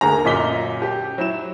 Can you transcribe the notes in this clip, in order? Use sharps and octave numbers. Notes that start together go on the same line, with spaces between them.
D2 A#3 G#4 A#5
F#2 A#2 D#5 B6 G7
G4
F#3 E4 E7